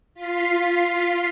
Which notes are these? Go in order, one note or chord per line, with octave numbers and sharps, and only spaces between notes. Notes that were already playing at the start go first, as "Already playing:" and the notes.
F4 B6 C7